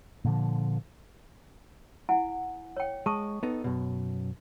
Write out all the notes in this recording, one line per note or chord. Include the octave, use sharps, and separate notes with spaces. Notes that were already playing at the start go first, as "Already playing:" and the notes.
A#2 D3 F3
E4 F#5 G#5
C#5 G5
G#3 A5 C#6 D#6
B3 D#4 A4
F#2 B2